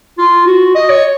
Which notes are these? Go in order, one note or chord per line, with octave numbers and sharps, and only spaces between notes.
F4
F#4
D#5
C#5